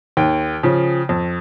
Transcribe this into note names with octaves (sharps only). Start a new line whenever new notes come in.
D#2 G5
C#3 F3
F2